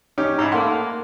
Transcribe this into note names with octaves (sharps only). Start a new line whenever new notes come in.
C#4 D#4 G4
G#2 D#4 E4
A3 A#3 F#5 C6